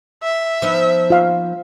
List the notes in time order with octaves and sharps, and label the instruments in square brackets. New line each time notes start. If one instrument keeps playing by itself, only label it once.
[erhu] E5
[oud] F3 B3 D#4
[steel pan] F4 F5